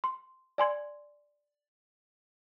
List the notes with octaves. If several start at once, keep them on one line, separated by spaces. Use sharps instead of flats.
C6
D5 G#5 C6 G#6